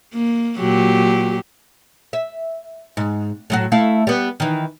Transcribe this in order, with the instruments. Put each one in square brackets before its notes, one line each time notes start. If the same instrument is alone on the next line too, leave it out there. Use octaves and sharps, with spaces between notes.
[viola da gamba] A#3
A#2 F#3 G4
[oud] E5
G#2
A2 F#3 F#4
A3 E4 F5
G3 B3
D#3 E3